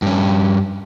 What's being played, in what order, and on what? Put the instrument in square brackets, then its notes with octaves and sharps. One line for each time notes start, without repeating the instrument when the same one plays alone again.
[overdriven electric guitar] G2 C#4